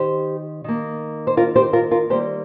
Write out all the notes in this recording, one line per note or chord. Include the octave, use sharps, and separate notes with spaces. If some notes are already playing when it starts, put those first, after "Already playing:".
Already playing: D#3 G4 C5
D#3 A#3
C5
F4 A#4
G4 C5
F4 A#4
F4 A#4
D#3 G3 A#3 G4 C5